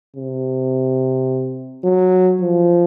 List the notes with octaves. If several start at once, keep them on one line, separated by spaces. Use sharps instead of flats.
C3
F#3
F3